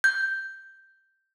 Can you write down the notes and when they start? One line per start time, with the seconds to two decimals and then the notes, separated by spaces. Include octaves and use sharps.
0.04 G6